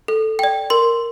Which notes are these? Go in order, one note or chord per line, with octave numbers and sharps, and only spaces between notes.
A4
D5 G5
A#4 C6